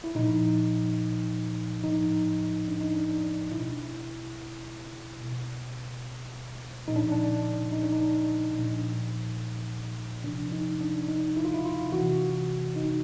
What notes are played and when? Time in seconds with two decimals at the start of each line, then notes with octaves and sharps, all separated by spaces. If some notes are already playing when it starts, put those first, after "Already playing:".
0.04 E4
0.15 A#2 F3 D#4
1.83 A2 F3 D#4
2.68 D4
2.81 D#4
2.94 D4
3.10 D4
3.51 B2 E4
5.19 B2
6.88 A#2 F3 D#4
6.96 D4
7.12 D4
7.72 D#4
7.83 D4
7.93 D#4
8.57 A#2 F3
10.24 C3 D4
10.28 F3
10.52 D#4
10.81 D4
11.08 D#4
11.37 E4
11.45 F4
11.54 E4
11.65 F4
11.92 C3 E3 F#4
12.76 D#4